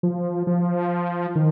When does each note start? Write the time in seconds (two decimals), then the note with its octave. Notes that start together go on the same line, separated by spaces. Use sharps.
0.03 F3
0.47 F3
1.36 D#3